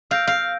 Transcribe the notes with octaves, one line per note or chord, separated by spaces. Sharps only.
F5 E6 G6 A#6 D7
F5